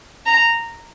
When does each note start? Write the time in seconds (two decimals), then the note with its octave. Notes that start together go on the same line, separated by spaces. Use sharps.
0.26 A#5